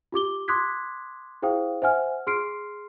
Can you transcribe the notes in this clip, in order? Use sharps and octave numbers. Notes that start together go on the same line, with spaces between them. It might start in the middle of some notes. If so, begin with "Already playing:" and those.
F4 G4 D6 G7
C6 D6 D#6 F#6 G#6 B6
E4 G#4 C5 F5 G5 D#6
C5 E5 F#5 G#5 F6
G#4 C6 F6 C7 D7